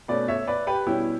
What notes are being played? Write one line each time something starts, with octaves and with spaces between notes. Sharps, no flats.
B2 A3 C#4 B4 D5
C#5 E5
B4 D5
G4 B4
B2 G3 C#4 E4 G4